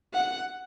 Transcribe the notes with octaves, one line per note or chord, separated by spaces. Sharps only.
F#5